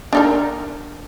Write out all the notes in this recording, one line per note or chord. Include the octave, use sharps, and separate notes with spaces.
D4 D#4 A#4